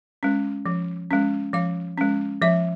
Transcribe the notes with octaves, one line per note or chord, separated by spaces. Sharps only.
G#3 C#4
F3
G#3 C#4
F3 F5
G#3 C#4
F3 E5